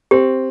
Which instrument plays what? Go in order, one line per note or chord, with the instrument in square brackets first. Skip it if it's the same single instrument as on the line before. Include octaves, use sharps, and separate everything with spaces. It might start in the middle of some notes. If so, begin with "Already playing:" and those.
[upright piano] C4 [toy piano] G4